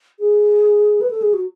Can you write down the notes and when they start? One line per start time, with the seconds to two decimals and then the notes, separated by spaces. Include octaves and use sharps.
0.20 G#4
1.01 B4
1.10 A4
1.22 G#4
1.33 F#4